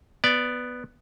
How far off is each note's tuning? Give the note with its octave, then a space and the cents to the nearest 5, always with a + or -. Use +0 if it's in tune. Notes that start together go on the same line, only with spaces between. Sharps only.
B3 +0 D5 +0